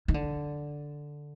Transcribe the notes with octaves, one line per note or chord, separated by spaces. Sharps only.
D#3
D3